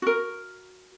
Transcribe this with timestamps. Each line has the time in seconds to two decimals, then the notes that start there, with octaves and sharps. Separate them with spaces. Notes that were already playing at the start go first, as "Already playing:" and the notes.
0.02 F#4 A#4